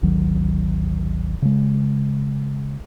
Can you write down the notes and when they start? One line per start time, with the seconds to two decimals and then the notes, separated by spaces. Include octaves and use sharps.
0.02 G#1 D2 D#3 F#3
1.42 C#3 G#3